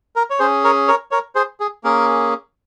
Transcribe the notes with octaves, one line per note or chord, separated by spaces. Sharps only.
A#4
C#5
C#4 G#4 C5
A#4 C#5
A#4 C#5
A#4 C#5
G#4 C5
G#4
A#3 C#4 G#4 A#4